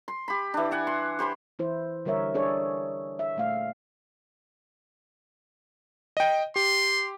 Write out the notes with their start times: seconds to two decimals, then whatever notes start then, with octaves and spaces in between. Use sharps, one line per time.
0.08 C6
0.28 G4 B5
0.54 E3 D4
0.71 E5 F#5 G#5
0.87 C6
1.19 G4 C5 B5 C6
1.59 E3 E4 C5
2.05 D3 G3 A#4 C#5 E5
2.34 D4 G#4 A4 C#5 D5
3.19 E5
3.36 A#2 A3 F5
6.17 D#5 G5
6.56 G4 C6